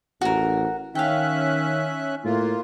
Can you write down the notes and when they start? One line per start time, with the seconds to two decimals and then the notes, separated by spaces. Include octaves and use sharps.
0.21 A1 F#4 A#4
0.95 D#3 C#4 E5 F5 G5 F#6
2.25 A2 A#3 F4